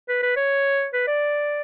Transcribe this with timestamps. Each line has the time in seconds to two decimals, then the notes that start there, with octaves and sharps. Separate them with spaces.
0.09 B4
0.23 B4
0.37 C#5
0.93 B4
1.07 D5